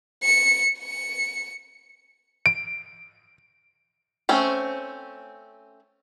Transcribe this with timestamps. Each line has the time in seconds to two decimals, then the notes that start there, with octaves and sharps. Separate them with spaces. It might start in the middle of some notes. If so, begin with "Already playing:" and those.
0.23 C#7
0.79 C#7
2.46 D7
4.29 A3 C4 C#4